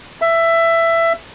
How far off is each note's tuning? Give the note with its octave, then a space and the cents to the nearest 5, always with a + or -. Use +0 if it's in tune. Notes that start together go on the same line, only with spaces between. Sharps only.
E5 +15